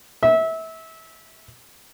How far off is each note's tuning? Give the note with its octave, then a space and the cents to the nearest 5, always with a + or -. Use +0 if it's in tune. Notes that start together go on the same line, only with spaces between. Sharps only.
E5 -25